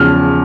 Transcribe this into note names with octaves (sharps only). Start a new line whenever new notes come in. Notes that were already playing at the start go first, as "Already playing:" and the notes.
Already playing: E2 C#3 F3 F6